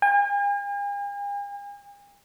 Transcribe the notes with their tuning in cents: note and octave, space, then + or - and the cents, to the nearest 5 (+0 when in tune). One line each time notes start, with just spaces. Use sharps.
G#5 -45